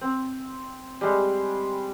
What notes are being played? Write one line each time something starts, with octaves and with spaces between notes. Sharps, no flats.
C4
G3 G#3